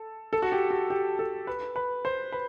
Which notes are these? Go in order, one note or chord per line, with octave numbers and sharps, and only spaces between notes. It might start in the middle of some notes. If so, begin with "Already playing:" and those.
Already playing: A4
A4
F#4
G4
F#4
G4
A4
B4
B4
C5
B4